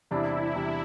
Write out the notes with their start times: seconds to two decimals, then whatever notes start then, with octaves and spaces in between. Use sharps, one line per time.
0.11 E2 C3 G3 D4 E4
0.55 E2 C3 G3 D4